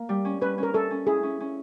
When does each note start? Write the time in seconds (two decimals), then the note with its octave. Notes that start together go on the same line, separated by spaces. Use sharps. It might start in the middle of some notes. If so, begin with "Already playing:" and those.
Already playing: A#3
0.09 G3
0.25 C#4
0.41 C#4 B4
0.58 C#4
0.63 A#4
0.74 C#4 A4
0.91 C#4
1.07 E4 G#4
1.23 C#4
1.40 C#4